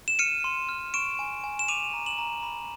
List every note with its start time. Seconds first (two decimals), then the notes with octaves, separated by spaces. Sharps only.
0.08 E7
0.19 F6 C#7 D#7
0.44 C6
0.69 F6
0.94 C#6 D7 E7
1.19 G#5
1.44 G#5
1.59 E7
1.68 D6 D#7 F7
1.94 A#5
2.06 E7 F#7
2.18 A#5
2.43 B5